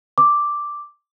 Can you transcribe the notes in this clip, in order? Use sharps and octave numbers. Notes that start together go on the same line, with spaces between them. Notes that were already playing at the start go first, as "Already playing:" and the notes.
D6